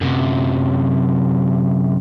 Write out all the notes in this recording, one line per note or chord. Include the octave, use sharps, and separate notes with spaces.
F#2 C3